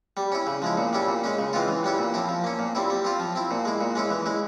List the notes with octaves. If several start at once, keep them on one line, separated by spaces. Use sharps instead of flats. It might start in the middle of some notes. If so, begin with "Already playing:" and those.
G3
C#4 E4
C#3
F3 G#3 E4
A#2
G3 C#4 E4
A#2
G#3 C#4
C#3
E3 G#3 C4 F4
E3
G3 C#4 E4
A#2
F3 C4 E4
F3
A#3 C#4
A#2
G3 C4 E4
G3
C4 F4
F3
C4 E4
A#2
G#3 E4
A#2
G#3 C#4 E4
E3
G#3 E4